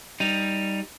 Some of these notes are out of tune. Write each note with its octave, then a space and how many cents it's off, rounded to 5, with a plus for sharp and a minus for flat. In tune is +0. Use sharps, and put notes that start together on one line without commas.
G3 +0 D#4 +0